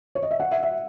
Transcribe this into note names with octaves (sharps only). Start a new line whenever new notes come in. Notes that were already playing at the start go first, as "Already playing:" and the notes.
C#5
D#5
E5
F#5
E5
E5